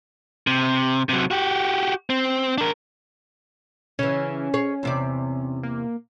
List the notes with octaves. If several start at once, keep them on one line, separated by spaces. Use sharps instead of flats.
C3
C3 F#3
F#4 G4
C4
D4 A#4
C#3 E3 C#4
G#4 C#5
E2 C3 D5
A#3